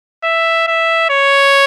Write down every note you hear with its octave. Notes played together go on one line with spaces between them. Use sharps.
E5
E5
C#5